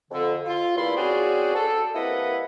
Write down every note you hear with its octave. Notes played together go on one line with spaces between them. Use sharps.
F2 D3
F4
E2 G2 A#2 E4 C6
C4 C#4 F#4 G#4 C5 D5
A4
C2 A#3 E4 B4 D#5 F#5